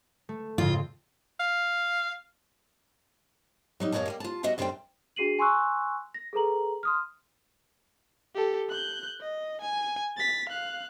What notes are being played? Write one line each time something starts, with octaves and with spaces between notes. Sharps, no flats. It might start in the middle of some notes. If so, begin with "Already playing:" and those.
A3
F2 G#2 C#3 F4
F5
F#3 G3 D#4
F#2 A#3 C5 C#5 D#5 A5
G3 A#3 G4
F4 A5
G3 F#4 D#5 E5 F#5
F#2 D3 G3 C5 D5 G5
D4 F#4 G#4 C7 D#7 F#7
G#5 C6 C#6 E6 F#6
A#6
G#4 A4 B4 A#5 F#7
C6 D#6 F6
G4 A4
F#6 G6
D#5
G#5
A6 B6
F5 F#6